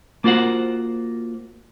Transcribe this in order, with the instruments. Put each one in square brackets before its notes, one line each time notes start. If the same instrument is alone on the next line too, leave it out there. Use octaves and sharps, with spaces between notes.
[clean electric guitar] A#3 F4 F#4 C5 F#5